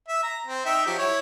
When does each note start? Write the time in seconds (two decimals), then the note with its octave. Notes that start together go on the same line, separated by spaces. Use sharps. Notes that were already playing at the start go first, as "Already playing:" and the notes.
0.08 E5
0.23 A#5
0.47 C4
0.65 D#4 E5 G5
0.86 F3 F#3 G4
0.98 E4 C#5